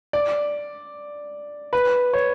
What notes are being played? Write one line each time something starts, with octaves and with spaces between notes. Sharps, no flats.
D5
B4
C#5